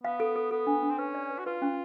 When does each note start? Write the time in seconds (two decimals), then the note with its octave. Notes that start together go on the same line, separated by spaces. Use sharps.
0.04 B3 F5
0.20 A4
0.36 A4
0.51 B3 A4
0.67 D4
0.83 D4
0.92 C4
0.98 C#4 B4
1.15 D5
1.31 B4
1.39 F#4
1.46 F4 B4
1.62 C#4